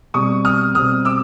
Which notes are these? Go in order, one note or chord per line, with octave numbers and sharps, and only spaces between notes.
B2 G3 C4 C#6 D#6
D#6 F6
B2 G3 C4 D#6 F6
D6 E6